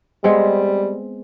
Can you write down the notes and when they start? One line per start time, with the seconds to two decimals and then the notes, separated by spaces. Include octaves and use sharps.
0.24 G3 G#3 B3 C4